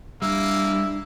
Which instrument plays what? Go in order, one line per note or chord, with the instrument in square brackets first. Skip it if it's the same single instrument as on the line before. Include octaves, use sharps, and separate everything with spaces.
[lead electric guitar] G3 [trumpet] A#3 [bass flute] D4 [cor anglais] E4